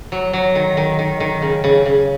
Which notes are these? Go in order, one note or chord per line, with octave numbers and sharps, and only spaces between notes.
F#3
F#3
D#3
D#3
D#3
D#3
C#3
C#3
C#3